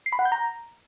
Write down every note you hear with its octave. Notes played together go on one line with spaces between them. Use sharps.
C7
B5
F#5
G6
A#5